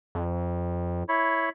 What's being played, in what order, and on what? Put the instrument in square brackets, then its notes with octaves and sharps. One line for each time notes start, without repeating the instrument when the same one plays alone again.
[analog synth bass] F2
[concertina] E4 C#5 B5